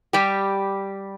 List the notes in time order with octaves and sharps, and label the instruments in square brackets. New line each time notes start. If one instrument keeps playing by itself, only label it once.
[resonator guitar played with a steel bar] G3 G4